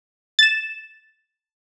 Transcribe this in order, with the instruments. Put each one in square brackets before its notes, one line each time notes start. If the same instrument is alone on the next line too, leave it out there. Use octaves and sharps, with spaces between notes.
[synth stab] A6 E7